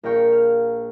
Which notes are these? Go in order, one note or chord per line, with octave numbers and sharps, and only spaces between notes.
A#1 A#4 F5 G5 C#6
F6